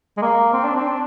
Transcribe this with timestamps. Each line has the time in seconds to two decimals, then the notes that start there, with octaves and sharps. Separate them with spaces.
0.17 G#3
0.22 A#3
0.53 C4
0.64 D4
0.76 C4
0.88 D4